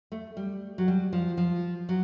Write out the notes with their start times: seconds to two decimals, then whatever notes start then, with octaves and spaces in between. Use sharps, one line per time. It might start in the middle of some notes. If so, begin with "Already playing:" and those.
0.12 A3
0.37 G3
0.78 F#3
0.88 G3
1.13 F3
1.37 F3
1.89 F#3